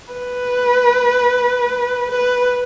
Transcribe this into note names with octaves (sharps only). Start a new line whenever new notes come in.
B4
B4